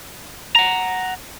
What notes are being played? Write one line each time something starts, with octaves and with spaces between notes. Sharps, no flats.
F#5 A#5